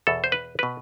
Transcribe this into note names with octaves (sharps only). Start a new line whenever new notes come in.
E2 B2 A4
C5
B4
B2 B4